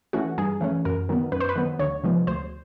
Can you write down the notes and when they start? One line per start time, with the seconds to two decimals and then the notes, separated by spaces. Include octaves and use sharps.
0.13 E3 A3 C#4 F#4
0.38 G2 G#4
0.61 E3 A3 C#4
0.85 F#2 A#4
1.09 D#3 F#3 B3
1.32 F#2 B4
1.40 C5
1.49 B4
1.56 D#3 F#3 B3
1.79 D2 C#5
2.04 C3 F3 G#3 B3
2.27 D2 C5